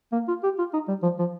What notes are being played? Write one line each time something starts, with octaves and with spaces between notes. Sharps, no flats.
A#3
F4
G4
F4
D#4
G3
F3
F3